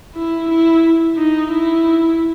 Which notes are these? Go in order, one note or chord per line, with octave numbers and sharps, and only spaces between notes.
E4
E4
D#4
E4